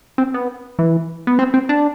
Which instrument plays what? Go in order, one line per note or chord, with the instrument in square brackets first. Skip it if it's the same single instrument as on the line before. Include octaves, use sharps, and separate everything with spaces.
[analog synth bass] C4
B3
E3
B3
C4
C4
D4